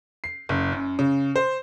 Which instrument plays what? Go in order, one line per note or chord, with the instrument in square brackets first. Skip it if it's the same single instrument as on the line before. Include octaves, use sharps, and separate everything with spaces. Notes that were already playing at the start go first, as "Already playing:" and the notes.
[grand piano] C7
F#1
F#2
C#3
C5